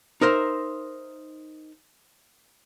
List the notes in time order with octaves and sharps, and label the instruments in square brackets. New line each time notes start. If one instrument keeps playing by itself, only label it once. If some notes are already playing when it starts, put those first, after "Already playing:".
[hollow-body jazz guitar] D#4 A#4 C5 E5